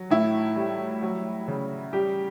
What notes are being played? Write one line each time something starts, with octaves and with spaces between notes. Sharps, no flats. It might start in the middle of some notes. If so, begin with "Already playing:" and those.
Already playing: F#3
A2 E4
G3
F#3
C#3
G3 G4